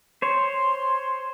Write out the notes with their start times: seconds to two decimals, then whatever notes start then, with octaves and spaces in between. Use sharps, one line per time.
0.22 C5 C#5 C6